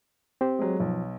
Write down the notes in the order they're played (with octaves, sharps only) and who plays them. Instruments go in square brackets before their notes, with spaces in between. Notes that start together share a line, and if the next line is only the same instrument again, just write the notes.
[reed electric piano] C4 G4 C5
[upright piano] F#3 G#3
[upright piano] B1 [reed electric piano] F3